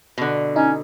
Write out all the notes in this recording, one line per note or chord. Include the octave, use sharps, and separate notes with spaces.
B2 D3
C#4 D#4